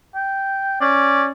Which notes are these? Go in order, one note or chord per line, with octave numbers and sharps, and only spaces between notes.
G5
C#4 D5